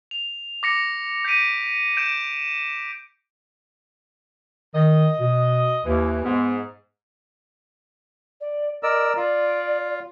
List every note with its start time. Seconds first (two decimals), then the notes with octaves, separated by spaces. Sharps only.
0.11 F7
0.63 D6 A#6 C#7
1.25 G6 A#6 B6 D7 D#7
1.97 G6 D7 E7
4.74 D#3 D#5
5.20 B2
5.84 D#2 E3
6.25 G#2 B3
8.41 D5
8.83 A#4 D5 D#5 E6
9.17 F4 D5